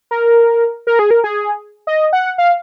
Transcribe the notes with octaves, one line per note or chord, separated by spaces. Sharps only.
A#4
A#4
G#4
A#4
G#4
D#5
F#5
F5